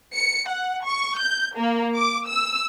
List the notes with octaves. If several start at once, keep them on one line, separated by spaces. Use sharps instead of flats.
C#7
F#5
C#6
G6
A#3
D6
E6